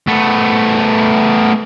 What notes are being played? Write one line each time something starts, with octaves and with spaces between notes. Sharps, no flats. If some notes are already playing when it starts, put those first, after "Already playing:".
A3 B3